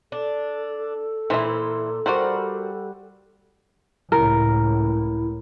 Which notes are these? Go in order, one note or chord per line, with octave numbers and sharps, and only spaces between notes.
D4 A4
A#2 E3 E4 C5 A#5
G3 F#4 A#4 C5 F#5
C#2 A2 E4 A#4